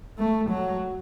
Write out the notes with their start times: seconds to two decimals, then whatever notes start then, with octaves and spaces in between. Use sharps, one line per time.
0.18 A3
0.50 F#3